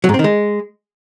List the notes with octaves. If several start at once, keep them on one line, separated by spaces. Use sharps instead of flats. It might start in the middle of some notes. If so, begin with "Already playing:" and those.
F#3
G#2
C4
D#3
G#3